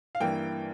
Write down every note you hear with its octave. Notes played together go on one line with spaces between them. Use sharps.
F5
G2 E3 A#3 G5